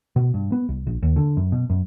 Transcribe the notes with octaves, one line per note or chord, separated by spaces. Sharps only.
B2
G2
B3
C2
A#1
D#2
D3
F#2
B2
F#2